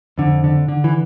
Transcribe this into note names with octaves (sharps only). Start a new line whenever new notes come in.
F2 D3
D3
D3
E3